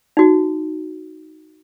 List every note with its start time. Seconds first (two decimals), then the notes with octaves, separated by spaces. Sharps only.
0.17 D#4 F#4